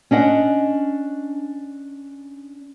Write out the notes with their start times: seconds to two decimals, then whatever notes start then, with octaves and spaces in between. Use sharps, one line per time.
0.11 C#4 D4 D#5 F#5